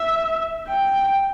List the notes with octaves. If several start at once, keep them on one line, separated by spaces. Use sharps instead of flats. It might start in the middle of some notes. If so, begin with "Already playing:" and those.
Already playing: E5
G5